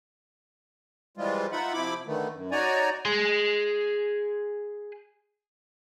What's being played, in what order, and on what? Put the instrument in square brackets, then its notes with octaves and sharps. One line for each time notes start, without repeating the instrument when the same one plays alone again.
[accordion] E3 F3 G3 G#3 F4
D#4 F4 E5 F#5 B5
C3 F3 E4 B5 D6
D3 D#3 A3 B3
F#2
D#4 F#4 C#5 D5 G#5 A#5
[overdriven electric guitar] G#4 C6